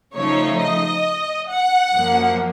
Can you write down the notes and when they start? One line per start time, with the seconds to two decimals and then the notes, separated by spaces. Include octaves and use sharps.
0.14 C#3 F3 A3 D#4 C#5
0.59 D#5
1.50 F#5
1.94 F#2 F3 A#3